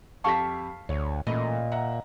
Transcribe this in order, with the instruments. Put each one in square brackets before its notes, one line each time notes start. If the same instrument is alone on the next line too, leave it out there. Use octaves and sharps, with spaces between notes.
[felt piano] F2 G4 B6 [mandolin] F5 A5 C#6
[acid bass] D2 [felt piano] C#5
[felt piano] A1 A3 B5 [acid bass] A#2 [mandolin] D#5
[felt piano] E5 F#5 A#5